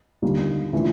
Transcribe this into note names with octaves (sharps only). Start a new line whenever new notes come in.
D#2 D3 G3 A#3 D#4
C#3 E3 A3 D4 F4